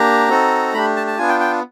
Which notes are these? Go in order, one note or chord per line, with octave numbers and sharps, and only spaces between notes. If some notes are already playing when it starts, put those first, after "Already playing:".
Already playing: A#3 D4 G4 A#5
C4 D#4 F#4 A4
A3 D4 G4 B5
A5
A5
B3 D4 F4 G#5
G5
G5